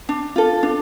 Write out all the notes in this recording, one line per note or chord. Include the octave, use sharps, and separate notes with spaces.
D4
F4 A4
D4